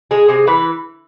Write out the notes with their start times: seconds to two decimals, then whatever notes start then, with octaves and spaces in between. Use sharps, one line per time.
0.11 G#3 G#4
0.28 C3 G#4
0.47 E3 B4